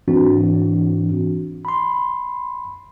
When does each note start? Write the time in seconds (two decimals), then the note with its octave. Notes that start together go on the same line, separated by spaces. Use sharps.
0.08 G#2 E3 C4 D4 F#4
1.65 B5 C6